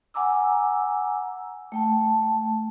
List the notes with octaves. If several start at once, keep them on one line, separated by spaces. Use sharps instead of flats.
F#5 G#5 A#5 D6 E6
A3 G5 A5